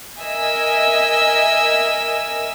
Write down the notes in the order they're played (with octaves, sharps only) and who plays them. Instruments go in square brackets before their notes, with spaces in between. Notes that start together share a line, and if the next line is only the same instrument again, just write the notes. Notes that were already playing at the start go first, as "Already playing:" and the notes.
[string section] A#4 D#5 E5 G#5 E6